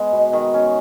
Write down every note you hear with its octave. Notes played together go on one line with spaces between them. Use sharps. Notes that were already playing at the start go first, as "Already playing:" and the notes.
Already playing: G#3 B3
B2
D#3
C#4